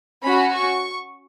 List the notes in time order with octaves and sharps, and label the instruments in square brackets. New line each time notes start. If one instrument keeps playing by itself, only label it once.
[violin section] C#4 F#4 B5
C#6